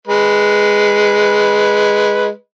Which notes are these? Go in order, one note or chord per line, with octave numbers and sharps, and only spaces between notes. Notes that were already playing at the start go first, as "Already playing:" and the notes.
G#3 B4